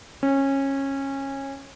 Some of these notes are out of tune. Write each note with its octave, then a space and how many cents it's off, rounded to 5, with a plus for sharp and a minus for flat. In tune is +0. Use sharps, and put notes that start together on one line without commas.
C#4 -20